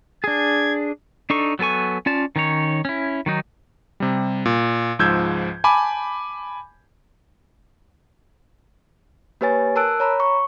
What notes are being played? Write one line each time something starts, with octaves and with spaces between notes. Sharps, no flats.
D4 G#4 G#6
D4 D#4 A4 C#6
F#3 B3 A4 G#5 C#6
C#4 F4 D5 A5
D#3 C#4 D#4 C#5
C#4 E4
D#3 F#3 D#4
C3 G3
A#2
C#2 G#2 F3 E6 G6 G#6
G#5 A5 B5 D6
A#3 G4 B4 C#5 G#5 A6
A#4 A5 E6 F#6 D7
C#5 A#5 B5
C#6